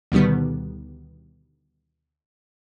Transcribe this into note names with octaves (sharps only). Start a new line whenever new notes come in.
D2 B2 D#3 G3 B3